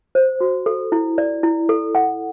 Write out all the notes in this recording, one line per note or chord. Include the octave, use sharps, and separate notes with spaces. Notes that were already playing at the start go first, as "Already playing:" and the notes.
C5
F#4
A4
E4
D5
E4
A4
F#5